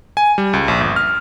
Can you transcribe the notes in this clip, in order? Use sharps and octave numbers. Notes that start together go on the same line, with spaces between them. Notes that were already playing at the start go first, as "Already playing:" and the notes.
G#5
G3
C#2
A#1
G1
F6